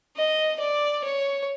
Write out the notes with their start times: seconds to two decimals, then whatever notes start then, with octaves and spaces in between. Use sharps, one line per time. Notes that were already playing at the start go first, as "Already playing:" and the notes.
0.16 D#5
0.60 D5
1.05 C#5